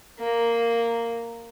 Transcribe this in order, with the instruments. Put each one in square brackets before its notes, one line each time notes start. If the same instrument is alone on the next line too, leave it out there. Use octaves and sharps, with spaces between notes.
[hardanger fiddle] A#3